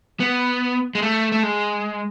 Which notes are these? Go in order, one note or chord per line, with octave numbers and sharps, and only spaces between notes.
B3
G#3
A3
A3
G#3